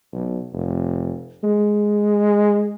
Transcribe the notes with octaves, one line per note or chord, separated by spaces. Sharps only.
B1
F1
G#3